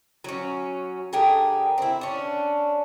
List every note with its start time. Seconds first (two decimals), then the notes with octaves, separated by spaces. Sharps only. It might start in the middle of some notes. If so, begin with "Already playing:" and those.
0.24 F#3 C#4
1.13 D3 G4 G#4 A#4
1.78 C4 E4
2.01 C#4 D4